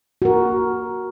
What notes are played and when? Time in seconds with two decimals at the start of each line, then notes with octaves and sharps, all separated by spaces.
0.22 F#4 A#4